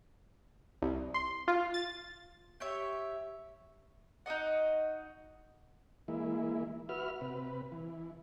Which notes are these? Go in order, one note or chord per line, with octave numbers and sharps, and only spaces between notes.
C2
C6
F4
A6
G4 C#5 E5
D#4 F#4 D#5 F#5
E3 G#3 A#3 E4
F#4 B4 E5 F6
C3 B4
E3